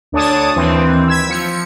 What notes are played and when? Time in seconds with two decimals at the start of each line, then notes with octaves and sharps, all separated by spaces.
0.12 D2 D4 C#5 A5 D#6
0.56 D#2 E3 C4
1.08 E6 G#6 B6
1.28 F3 C#7